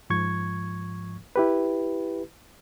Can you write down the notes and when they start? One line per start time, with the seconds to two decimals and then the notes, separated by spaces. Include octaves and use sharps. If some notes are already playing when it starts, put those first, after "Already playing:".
0.10 G#2 F3 C#6 G#6
1.36 E4 G4 B4